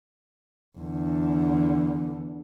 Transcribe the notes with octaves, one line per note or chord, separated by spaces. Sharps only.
E2 D3